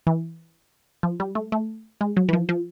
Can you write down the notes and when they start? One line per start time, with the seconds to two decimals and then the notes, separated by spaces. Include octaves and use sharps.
0.07 E3
1.03 F3
1.20 G3
1.35 A3
1.52 A3
2.01 G#3
2.17 F#3
2.29 E3
2.33 F3
2.49 F3